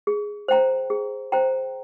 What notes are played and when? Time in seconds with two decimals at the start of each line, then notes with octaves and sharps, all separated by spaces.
0.07 G#4
0.48 C5 G5 A#5
0.90 G#4
1.32 C5 G5 A#5